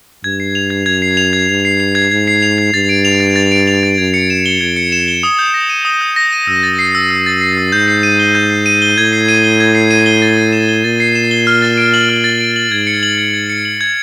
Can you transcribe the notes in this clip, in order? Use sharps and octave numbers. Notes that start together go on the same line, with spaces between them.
G2 G#6
C7
F7
G#6
F#2 G#6
C7
F7
G#6
G2 G#6
C7
F7
G#6
G#2 G#6
C7
F7
G#6
G2 A6
D7
F7
A6
A6
D7
F7
A6
F#2 G#6
C#7
E7
G7
F2 G#6
C#7
E7
G7
D#6
G6
A#6
D#7
D#6
G6
A#6
D#7
F#2 E6
A6
C7
E6
E6
A6
C7
E6
G#2 G6
C7
D#7
G7
G6
C7
D#7
G7
A2 G#6
C7
D#7
G7
G#6
C7
D#7
G7
A6
C7
E7
G7
A#2 A6
C7
E7
G7
F6
A6
D7
F#7
F6
A6
D7
F#7
G#2 G#6
C#7
F#7
G#6
G#6
C#7
F#7
G#6